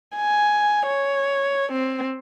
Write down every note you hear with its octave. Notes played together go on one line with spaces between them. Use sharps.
G#5
C#5
C4